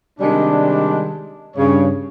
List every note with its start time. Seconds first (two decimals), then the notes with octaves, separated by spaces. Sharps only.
0.20 C3 D#3 G3 G#3 D4
1.57 G2 C#3 C#5